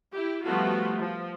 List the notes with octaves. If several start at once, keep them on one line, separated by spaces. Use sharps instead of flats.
E4 G4
F3 G3 A3 B3 F4 F#4
F3